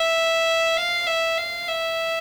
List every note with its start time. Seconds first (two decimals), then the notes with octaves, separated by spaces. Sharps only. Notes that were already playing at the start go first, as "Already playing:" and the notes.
Already playing: E5
0.77 F5
1.07 E5
1.38 F5
1.68 E5